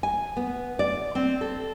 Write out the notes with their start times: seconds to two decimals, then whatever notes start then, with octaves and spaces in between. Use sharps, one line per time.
0.03 G#5
0.37 B3
0.79 D5
1.15 C4
1.41 A4